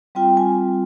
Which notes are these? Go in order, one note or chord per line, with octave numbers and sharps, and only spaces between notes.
G3 C4 F4 G5
G#5